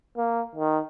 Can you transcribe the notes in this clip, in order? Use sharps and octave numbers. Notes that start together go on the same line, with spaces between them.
A#3
D#3